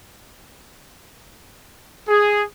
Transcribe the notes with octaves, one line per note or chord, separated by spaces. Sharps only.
G#4